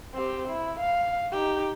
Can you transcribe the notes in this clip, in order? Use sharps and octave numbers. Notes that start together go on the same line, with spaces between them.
C4 G4
E4
F5
D#4 G4